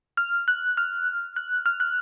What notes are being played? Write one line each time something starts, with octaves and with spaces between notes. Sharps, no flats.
F6
F#6
F6
F#6
F6
F#6